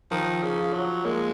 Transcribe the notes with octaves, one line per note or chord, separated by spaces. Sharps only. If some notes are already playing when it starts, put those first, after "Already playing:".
D#3 F3
C#3
F4
F#3
G#3 A#3